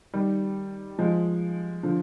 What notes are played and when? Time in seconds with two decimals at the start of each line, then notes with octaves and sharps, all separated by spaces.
0.13 D#3 G3
0.98 F3 G#3
1.83 D3 F3